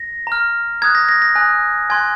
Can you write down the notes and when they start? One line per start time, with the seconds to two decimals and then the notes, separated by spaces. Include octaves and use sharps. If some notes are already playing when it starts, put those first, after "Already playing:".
Already playing: A#6
0.27 A#5 F6
0.82 A#5 D#6 F#6 G#6
0.95 A#6
1.09 A#6
1.22 A#6
1.35 G#5 D#6 F#6
1.90 G#5 C6 F#6 G#6